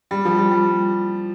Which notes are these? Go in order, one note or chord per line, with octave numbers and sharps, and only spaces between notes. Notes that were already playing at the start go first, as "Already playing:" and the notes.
G3
F3
G3
G3